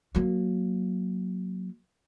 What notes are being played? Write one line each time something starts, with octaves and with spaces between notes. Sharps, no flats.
F#3 A#3